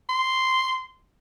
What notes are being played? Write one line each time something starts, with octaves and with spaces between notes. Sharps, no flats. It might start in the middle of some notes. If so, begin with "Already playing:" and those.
C6